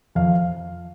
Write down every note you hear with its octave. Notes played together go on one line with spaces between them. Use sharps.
F2 F5